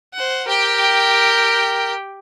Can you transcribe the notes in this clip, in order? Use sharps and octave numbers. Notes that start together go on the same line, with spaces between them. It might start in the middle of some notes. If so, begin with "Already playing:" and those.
C5 F#5
G4 A#4 G5